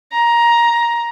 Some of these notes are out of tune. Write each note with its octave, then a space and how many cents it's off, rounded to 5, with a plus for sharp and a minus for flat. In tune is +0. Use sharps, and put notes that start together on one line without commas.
A#5 +15